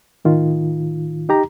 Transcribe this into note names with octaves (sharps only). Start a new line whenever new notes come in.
A2 D#3 F4
D#4 G4 A#5